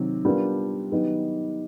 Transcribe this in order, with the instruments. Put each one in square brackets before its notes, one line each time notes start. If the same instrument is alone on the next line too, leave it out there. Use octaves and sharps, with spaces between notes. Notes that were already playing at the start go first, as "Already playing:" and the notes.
Already playing: [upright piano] C3 D#3 F#3
G3 B3 D4 F4 A#4
D#3 F#3 B3 D#4 G4